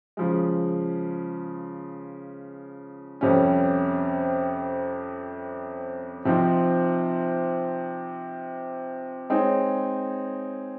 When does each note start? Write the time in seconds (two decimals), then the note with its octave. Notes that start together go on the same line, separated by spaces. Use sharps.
0.17 C#3 F3 G#3
3.21 F2 C3 G3 C#4
6.25 C3 F3 C4 D#4
9.30 G#3 C4 D#4 G#4 C#5